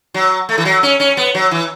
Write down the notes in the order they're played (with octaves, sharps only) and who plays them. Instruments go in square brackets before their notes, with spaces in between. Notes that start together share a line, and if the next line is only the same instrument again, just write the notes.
[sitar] F#3
A3
E3
F#3
C#4
C#4
B3
F#3
E3